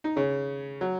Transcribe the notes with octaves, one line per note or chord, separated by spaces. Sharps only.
D#4
C#3 C#4
F#3